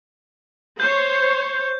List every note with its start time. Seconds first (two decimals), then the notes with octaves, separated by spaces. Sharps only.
0.80 C5 C#5 G6